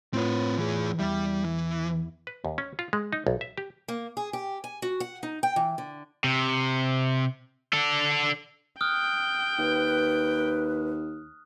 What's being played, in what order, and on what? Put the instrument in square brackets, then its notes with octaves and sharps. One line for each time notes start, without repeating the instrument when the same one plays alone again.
[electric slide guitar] A2 F4 C#5 [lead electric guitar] C4 B4
[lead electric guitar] E3 G#4
[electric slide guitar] E2 E4 [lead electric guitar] G3
[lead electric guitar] E3
[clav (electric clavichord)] B4
D#2
C#4
F4
G#3
D#4
B1
E5
G4
[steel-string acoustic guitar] A#3
G#4
G4
G#5
F#4
F#5
D#4
G5
E3
D3
[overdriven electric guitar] C3
D4 A4
[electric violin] G5 [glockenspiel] D#6 F6 F#6
[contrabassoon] D#2 [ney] B4